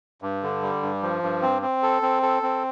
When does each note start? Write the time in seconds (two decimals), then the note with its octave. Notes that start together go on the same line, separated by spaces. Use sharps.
0.22 G2
0.43 D3
0.62 G3
0.82 G2
1.02 F3
1.23 G2
1.42 C4
1.62 C4
1.83 A4
2.02 C4
2.23 A4
2.43 C4